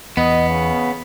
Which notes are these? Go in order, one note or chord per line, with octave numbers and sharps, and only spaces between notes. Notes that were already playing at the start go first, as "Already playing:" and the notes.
E2 B3 D#5
C#3